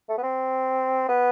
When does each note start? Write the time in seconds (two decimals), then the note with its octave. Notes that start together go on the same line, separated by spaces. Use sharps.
0.09 A3
0.18 B3
0.23 C4
1.09 B3